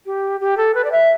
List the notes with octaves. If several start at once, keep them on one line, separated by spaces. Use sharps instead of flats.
G4
G4
A4
B4
D5
E5